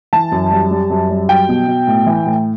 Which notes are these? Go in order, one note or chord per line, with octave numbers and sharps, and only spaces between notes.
E3 A5
F#2
G3
G3
F#2
G3
F#3 G5
B2
B2
A2
E3
A2